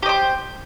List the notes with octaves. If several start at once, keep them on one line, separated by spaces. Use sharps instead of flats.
G4 C5 D#5